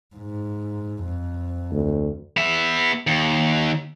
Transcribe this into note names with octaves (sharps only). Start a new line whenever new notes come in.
G#2
F2
D2
B3 E5
D#2